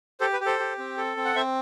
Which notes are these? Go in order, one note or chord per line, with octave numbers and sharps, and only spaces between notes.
G4 A4 C5
B4
G4
A4 C5
G4
C4
A4
C4
F#5
C4 C5 E5